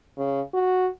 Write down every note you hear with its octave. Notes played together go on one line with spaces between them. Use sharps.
C#3
F#4